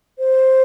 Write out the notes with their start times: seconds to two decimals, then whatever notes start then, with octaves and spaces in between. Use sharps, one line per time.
0.19 C5